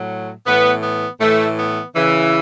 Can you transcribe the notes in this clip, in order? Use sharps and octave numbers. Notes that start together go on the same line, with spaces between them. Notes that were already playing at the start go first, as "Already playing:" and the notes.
Already playing: A2 F#3
A2 E3 B3
B3
A2 E3 A3
B3
C#3 E3